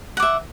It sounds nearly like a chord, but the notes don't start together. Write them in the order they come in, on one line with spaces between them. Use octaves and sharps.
F#5 D6 E5